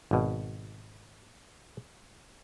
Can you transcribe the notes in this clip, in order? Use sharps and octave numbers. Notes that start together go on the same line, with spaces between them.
G#1 B2